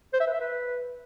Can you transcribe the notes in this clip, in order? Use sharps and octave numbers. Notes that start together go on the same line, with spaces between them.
C5
E5
B4
E5
B4